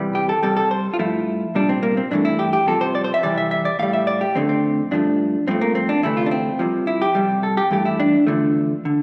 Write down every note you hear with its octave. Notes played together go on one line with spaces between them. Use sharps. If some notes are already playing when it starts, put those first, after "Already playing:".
Already playing: E2 C3 E3 G3
G4
A4
C2 C3 G3 A4
A4
C5
F4
G2 F3 A3 E4
C2 A#2 G3 D4
C4
A#3
C4
G2 E3 A3 D4
E4
G4
G4
C2 C3 F3 A4
C5
D5
C5
E5
F2 C3 E3 G3 D5
E5
E5
D5
A2 G3 F5
E5
D5
G4
F2 D3 A3 C4
C4
G2 F3 A3 D4
G2 F3 A3 C4
A#3
C4
D4
D2 C3 E3 A3 E4
F4
D4
C4
C2 C3 F3
E4
G4
F2 C3 G3
A4
G4
G2 E3 A3 G4
E4
D4
E2 D3 F3 A3
D3